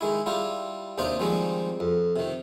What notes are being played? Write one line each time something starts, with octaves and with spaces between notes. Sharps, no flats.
D#3 G#3 E4
G3 E4 F4 G4
D#2 C3 D4 D#4 C5 F5
D#3 F3 G3 G#3 C4
F2
C3 D#3